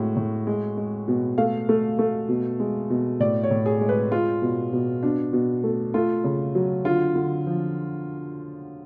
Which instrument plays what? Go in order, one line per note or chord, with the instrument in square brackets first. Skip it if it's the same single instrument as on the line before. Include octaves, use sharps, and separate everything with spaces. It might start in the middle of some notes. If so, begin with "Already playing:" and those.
Already playing: [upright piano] A2 G#3 F#4
A2
G#3
G#3
B2
A3 F5
A3
A3
B2
G#3
B2
A2 D5
C#5
A2
G#4
G#3
B4
G#3 F4
B2
B2
B2 D4
B2
A3
A3 F4
C#3
F#3
D3 F4
D3
F3